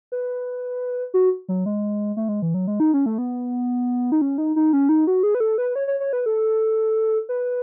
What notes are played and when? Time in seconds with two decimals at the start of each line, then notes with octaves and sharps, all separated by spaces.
0.12 B4
1.14 F#4
1.49 F#3
1.66 G#3
2.17 A3
2.29 G#3
2.42 E3
2.54 F#3
2.67 G#3
2.80 D#4
2.94 C#4
3.06 A3
3.18 B3
4.12 D#4
4.21 C#4
4.38 D#4
4.56 D#4
4.73 C#4
4.89 D#4
5.07 F#4
5.23 G#4
5.35 B4
5.40 A4
5.58 B4
5.76 C#5
5.88 C#5
6.00 C#5
6.13 B4
6.26 A4
7.29 B4